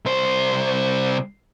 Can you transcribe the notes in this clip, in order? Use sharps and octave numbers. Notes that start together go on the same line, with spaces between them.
C2 C5